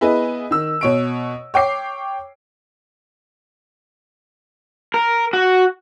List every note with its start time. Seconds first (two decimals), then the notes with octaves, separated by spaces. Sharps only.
0.01 B3 E4 G#4 B4 D#5
0.51 D#3 E6
0.81 B2 C#5 D7
1.54 C#5 G5 D6 C7
4.94 A#4
5.33 F#4